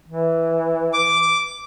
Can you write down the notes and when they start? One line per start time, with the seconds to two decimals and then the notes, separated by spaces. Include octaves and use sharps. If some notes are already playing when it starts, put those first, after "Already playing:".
0.08 E3
0.93 D6